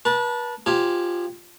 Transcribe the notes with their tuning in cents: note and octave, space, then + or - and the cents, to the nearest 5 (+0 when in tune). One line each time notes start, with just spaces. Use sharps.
B4 -35 A5 +0
F3 +0 G4 +0 G#5 -5